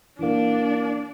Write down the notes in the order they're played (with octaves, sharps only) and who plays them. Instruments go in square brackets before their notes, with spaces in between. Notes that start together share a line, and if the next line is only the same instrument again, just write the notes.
[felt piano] E3 A#3 [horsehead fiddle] D4 D5